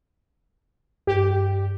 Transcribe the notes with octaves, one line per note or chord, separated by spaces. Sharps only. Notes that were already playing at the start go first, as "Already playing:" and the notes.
G2 G4